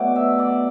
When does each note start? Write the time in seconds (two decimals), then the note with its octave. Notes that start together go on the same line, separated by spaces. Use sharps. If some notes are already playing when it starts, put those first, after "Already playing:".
Already playing: B2 F#3 A3 D5
0.16 E5
0.39 D5